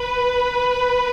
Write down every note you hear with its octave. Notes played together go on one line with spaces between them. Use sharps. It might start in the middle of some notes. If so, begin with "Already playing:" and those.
Already playing: B4